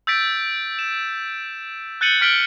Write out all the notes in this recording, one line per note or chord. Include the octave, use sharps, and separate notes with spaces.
E6 G6 A6 B6 D7
E7
F#6 G6 A6 C#7 D#7 F#7
F6 B6 D7 F#7 G7